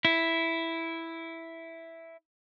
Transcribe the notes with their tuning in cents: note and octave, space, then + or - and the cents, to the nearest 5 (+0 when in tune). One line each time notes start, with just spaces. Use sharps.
E4 +0